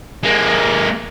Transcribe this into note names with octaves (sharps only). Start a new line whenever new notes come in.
G#3 A#3